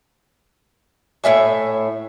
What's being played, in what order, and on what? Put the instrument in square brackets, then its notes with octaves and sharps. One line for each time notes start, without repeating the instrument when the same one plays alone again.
[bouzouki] A2 D4 E5 G#5